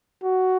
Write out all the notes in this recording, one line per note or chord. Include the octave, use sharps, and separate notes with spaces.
F#4